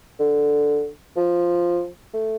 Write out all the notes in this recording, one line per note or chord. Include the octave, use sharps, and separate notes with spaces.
D3
F3
A3